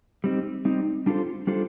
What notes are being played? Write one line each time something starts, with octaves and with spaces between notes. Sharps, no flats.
G3 C4 D#4
G3 C4 D#4
G3 D4 F4 A4 C5
G3 D4 F4 A4 C5